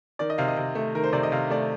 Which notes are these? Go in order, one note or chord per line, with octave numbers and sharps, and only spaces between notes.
D#3 D5
D#5
C3 F5
D#5
C3
A3
D#3 A#4
C5
C3 D5
D#5
C3 F5
A3 D5